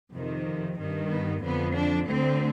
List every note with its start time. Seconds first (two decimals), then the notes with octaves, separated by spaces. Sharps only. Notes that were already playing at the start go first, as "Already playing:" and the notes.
0.13 F2 C3 D#3
0.77 G2 D#3
1.10 B3
1.42 F2 D3 B3
1.76 D4
2.08 D2 D3 C4